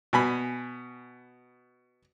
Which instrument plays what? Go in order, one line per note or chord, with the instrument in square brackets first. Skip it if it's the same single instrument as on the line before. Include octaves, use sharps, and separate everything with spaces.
[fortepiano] B2 G#5 B5